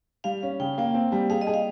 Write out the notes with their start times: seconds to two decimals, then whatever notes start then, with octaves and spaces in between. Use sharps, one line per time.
0.24 G3 F5
0.43 C#4
0.60 C#3 G5
0.78 A#3 G5
0.94 C4
1.12 G3
1.30 G#4 F5
1.41 D#5
1.47 G#4
1.54 F5